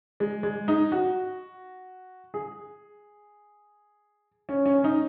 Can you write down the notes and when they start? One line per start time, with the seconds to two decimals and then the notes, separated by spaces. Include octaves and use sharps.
0.20 G#3
0.43 G#3
0.68 D#4
0.92 F#4
2.34 G#4
4.49 C#4
4.66 C#4
4.78 C#4
4.84 D#4